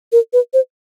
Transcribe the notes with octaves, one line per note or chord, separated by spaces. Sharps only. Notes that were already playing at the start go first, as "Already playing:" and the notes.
A#4
B4
C5